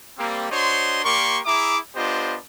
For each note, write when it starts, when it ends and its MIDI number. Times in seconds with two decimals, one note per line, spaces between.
0.18 0.47 55
0.18 0.47 58
0.18 0.47 60
0.51 1.02 62
0.51 1.02 66
0.51 1.02 72
0.51 1.02 73
0.51 1.02 75
0.51 1.02 84
1.04 1.40 58
1.04 1.40 67
1.04 1.40 70
1.04 1.40 74
1.04 1.40 84
1.04 1.40 85
1.46 1.77 64
1.46 1.77 68
1.46 1.77 76
1.46 1.77 82
1.46 1.77 86
1.95 2.37 59
1.95 2.37 62
1.95 2.37 65
1.95 2.37 67
1.95 2.37 72
1.95 2.37 75